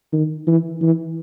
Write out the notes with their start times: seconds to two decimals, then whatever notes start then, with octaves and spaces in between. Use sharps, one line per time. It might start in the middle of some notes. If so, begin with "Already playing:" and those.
0.13 D#3
0.47 E3
0.81 E3